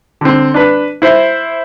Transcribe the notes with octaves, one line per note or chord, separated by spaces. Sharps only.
D3 C4
D4 B4
E4 C5